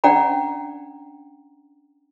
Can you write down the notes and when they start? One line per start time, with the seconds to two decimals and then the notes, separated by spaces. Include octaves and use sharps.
0.04 C#4 D4 D5 F#5 G5 A#5